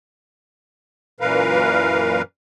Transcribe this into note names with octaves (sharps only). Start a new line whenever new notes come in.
F#2 A#2 E3 A#4 B4 F5